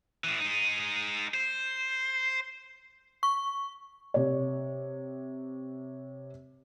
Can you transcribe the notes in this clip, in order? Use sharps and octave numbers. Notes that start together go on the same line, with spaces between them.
A2 E3
G#3 D#4
C5
C#6
C3 C#5